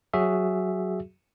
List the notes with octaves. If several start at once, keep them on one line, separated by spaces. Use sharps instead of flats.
F#3 F#4 G#4 E5